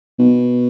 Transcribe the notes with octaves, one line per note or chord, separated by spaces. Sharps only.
B2